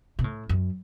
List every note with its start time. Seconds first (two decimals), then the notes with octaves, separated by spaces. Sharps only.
0.19 B2
0.24 A2
0.49 F#2